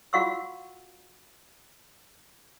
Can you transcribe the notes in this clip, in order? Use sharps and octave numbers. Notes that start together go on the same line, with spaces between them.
F4 F#4 F5 F#5 C#6 E6